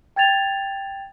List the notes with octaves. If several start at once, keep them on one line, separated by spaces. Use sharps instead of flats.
G5 G#6 A6 F7